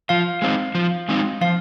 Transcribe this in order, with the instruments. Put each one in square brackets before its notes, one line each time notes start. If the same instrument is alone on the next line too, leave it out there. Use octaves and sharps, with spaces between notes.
[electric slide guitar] F3 [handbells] F5
[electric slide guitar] G#3 C4 D#4
F3
G#3 C4 D#4
[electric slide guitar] F3 [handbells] F5